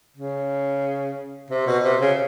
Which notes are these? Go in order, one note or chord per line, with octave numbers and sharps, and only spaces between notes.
C#3
C3
B2
C3
C#3